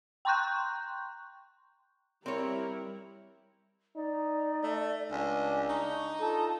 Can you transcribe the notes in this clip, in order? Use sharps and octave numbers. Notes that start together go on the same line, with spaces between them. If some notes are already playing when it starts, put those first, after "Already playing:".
G5 A#5 C6 C#6 F#6 G6
G3 C4 E4 A#4 C#5
D#4 D5
A3
C#2 D4 G#5
D#4 C#6
F4 A4 A5